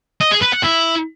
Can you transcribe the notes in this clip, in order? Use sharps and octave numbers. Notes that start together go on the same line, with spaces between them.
D#5
G#4
B4
F#5
E4